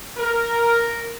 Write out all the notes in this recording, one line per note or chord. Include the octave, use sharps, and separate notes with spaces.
A#4